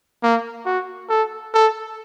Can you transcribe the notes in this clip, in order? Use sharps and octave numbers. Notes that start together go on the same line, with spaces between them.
A#3
F#4
A4
A4